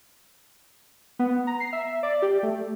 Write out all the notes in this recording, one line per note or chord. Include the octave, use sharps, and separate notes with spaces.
B3
A#5
C7
E5
D5
G4
A3